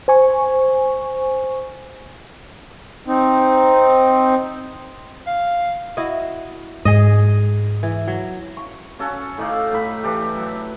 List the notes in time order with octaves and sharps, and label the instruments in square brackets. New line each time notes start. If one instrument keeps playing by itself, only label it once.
[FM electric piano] C5 G#5 C#6
[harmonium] C4 D#4
[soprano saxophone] F5
[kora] E4 F#4 D#5
[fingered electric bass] G#2 [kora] G#4 D#5
[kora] E3
F#3
[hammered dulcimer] C#6
C#4 F#4 A4
A2 D#4 D5 F5
A2 B5
E3 D4 G4
F#3